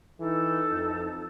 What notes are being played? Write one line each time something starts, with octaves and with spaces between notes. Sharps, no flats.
E3 D#4 A4
F2